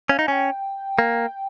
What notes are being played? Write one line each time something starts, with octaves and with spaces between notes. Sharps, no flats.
C#4 F5
D#4
C#4 G5 G#5
A#3